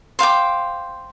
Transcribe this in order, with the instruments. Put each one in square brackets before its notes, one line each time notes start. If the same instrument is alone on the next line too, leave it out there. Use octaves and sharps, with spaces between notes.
[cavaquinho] C5 F5 G5 D6